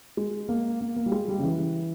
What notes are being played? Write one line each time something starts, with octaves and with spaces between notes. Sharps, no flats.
G#3
A#3
A#3
A#3
G3
G#3
G3
C#3
E3